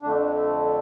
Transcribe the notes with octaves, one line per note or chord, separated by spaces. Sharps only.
F2 D3 A3 D4